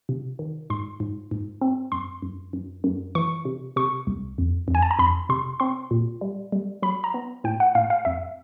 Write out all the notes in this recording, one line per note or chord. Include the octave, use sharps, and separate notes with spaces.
C3
D#3
G#2 C6
G#2
G#2
C4
F#2 C6
F#2
F#2
F#2
E3 C#6
C3
C3 C#6
C2
F2
F2
G#5
A5
A#5
F2 B5
C3 C6
C4 C6
A#2
G3
G3
F#3 B5
A#5
B3
A2 G5
F#5
A2 F5
F5
F2 E5